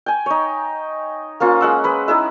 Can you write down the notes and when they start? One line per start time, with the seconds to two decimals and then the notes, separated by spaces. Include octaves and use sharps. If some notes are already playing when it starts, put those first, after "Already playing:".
0.06 G5 G#5
0.26 D#4 C#5
1.40 A#3 C#4 F4 C5
1.61 G#3 F#5 E6
1.84 G#4 B4 B5
2.08 D#4 E4 G#4 E5